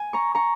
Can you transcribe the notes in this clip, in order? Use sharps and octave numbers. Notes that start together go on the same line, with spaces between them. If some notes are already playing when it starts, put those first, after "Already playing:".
Already playing: G#5
A#5 C#6
A#5 C#6